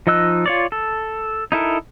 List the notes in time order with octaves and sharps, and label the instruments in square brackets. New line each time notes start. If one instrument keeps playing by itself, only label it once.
[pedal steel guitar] F3 D#4 D#5 E6 F#6
F4 C#5 D5
A4
D#4 E4 A4 A#4